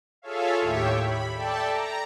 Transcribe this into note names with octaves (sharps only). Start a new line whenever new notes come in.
F4 G#4 A4 C#5 E5 F5
D#2 A2 G4 C#5 E5
B5
A4 D5 E5 G5 A5
A#5